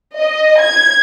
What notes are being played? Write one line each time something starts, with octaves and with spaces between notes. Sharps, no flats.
D#5
G#6